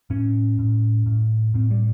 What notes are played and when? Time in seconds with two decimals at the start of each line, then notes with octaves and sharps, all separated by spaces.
0.10 A2 C#4
0.59 A2
1.06 A2
1.54 A2 C4
1.71 G3